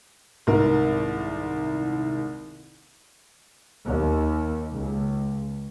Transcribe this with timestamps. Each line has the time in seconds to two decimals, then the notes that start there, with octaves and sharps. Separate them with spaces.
0.47 D#1 C2 G#2 A#4
3.87 D#2
4.74 C#2